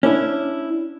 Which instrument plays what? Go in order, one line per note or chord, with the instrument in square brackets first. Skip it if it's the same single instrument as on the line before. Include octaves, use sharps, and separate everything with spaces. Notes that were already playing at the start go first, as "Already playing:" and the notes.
[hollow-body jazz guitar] C#4 D4 E4